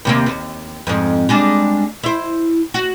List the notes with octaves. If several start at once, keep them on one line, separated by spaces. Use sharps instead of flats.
D#2 C3 A#3
D#2
F2 G#2
G3 G#3 D4
E4 C5
F#4